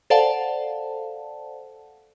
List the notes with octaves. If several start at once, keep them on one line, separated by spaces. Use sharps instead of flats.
A4 C5 D5 F5 F#5 A5